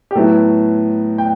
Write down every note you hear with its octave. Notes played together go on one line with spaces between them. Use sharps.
G4
A2 F#3 B3 E4 A4
G5